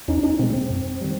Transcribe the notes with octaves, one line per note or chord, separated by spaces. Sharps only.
E2 C#4 D#4
D4
C#4 D#4
B2 G#3 C4
C4
F#2
D#3 G3